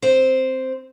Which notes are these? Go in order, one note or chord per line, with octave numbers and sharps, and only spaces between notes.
C4 C5